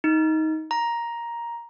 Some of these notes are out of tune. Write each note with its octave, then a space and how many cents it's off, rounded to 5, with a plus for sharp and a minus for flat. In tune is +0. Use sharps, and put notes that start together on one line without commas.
D#4 +20
A#5 +10